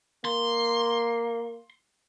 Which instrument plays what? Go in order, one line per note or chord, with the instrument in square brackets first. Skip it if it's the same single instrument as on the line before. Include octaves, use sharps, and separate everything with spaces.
[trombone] A#3 [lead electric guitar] C6